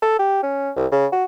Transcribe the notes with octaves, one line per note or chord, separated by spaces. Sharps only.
A4
G4
C#4
C2
C#3
F#4